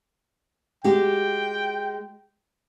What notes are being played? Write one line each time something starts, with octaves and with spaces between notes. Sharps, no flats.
G#3 F#4 G4 G5